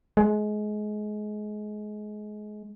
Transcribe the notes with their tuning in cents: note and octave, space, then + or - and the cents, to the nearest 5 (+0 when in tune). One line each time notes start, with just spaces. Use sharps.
G#3 +25